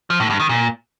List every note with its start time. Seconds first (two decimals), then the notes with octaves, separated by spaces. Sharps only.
0.10 F3
0.20 A2
0.30 G2
0.40 D#3
0.49 A#2